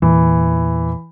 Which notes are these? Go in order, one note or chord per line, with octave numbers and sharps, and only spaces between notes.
E2 A#2 E3